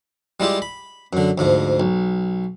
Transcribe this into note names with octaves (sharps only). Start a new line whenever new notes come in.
G3 G#3 E4 F4 G4
B5
F#2 D3
D2 G#2 F3
B1